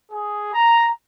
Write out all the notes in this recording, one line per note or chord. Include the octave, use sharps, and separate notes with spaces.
G#4
A#5